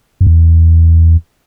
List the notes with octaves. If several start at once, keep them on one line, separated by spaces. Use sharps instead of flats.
F#2
E2